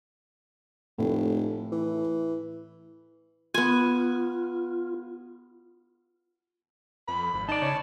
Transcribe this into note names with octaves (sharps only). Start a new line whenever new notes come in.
F1 A2
E3
B3 F4 G#5
F2 B5
G#1
D#4 D5 A5
C#3 C#5